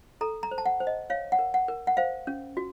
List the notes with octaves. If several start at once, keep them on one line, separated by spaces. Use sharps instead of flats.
A4 A#5
A#5
C5
A5
F#5
C5
D#5
C#5 F5
F#5
A#4
F#5
A#4
F#5
C5 F5
C#4
F#4